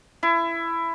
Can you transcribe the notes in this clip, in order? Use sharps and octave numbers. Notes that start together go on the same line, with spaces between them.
E4